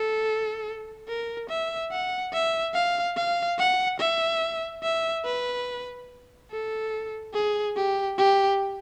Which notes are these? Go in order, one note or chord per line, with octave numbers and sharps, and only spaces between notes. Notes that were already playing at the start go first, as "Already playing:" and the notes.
Already playing: A4
A#4
E5
F#5
E5
F5
F5
F#5
E5
E5
B4
A4
G#4
G4
G4